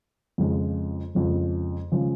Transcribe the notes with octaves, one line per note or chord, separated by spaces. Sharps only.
F2 C#3 F3 G#3
F2 C#3 F3 G#3
C#3 F3 G#3